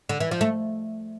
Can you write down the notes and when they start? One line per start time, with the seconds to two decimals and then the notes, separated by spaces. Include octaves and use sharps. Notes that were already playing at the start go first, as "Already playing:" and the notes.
0.09 D3
0.20 E3
0.31 F3
0.41 A3